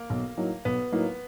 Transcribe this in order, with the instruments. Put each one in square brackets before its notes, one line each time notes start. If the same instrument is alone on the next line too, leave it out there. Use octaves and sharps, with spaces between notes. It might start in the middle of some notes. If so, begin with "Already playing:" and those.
Already playing: [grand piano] A#3
[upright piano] B1
A2 F#3 A#3 D#4
[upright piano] B1 [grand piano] B3
[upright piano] A2 F#3 A#3 D#4